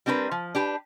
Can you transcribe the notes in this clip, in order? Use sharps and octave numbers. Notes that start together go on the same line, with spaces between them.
G3 C4 D4 A#4 B4
F3
D4 G4 B4